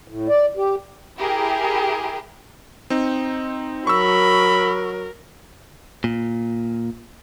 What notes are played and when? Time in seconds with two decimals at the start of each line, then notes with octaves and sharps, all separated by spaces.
0.08 A2
0.29 D5
0.57 G4
1.18 E4 G4 G#4 A#4
2.90 C4 D#4
3.87 F#3 A#4 B5 C#6 E6
6.04 A#2